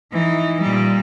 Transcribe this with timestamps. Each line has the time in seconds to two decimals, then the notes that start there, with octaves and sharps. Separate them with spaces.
0.12 E3 D#4
0.61 A#2 G3